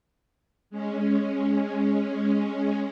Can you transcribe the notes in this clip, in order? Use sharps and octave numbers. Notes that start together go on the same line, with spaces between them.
G#3 C#4